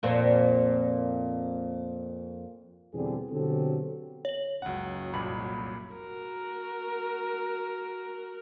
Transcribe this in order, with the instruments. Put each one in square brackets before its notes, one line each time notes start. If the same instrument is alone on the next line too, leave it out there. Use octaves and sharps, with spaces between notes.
[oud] F2 A#2 C4
[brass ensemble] E2 B2 D3 G3 C4 G#4
B2 D3 F#3 C4 G4 A4
[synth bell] C#5 F#7
[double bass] F#1 F#3 [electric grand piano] C#2 F#5
[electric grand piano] C2 F2 A#2 [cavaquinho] B5
[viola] F#4 A#4